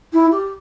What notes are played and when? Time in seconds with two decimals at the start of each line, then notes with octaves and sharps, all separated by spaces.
0.13 E4
0.31 G4